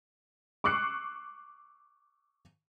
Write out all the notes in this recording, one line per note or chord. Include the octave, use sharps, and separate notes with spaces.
C#6 D6 E6 F#6 C7 C#7